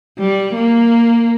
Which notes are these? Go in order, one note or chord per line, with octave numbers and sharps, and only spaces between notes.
G3
A#3